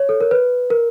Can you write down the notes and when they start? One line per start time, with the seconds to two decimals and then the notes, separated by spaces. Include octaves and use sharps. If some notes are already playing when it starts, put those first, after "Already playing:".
Already playing: C#5
0.09 A4
0.21 A#4
0.31 B4
0.70 A#4